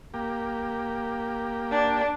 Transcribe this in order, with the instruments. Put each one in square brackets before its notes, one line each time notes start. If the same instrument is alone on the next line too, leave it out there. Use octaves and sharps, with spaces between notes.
[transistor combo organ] A#3 G4
[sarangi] D4